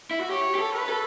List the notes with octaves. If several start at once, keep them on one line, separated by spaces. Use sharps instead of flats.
E4
F#4
G4 C#5
G4
A4
B4
A4